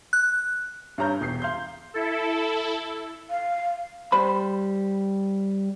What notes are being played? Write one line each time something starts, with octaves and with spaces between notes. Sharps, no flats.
F#6
G2 D4 C#5 A#5 F6 G6
E1 G6 C7
F5 C6 G6
E4 A4
F5
G3 C5 B5